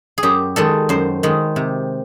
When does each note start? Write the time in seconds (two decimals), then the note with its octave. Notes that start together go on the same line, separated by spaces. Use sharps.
0.18 G#4
0.23 F#2 G4
0.56 D#3 G#3 A4
0.89 F#2 C5
1.23 D#3 G#3
1.56 C3